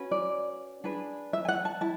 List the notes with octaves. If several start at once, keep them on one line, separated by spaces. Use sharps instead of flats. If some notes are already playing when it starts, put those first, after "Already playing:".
Already playing: C#4 F#4 B4
D5
D4 G#4 B4
E5
G#5
F#5
A5
E4 A5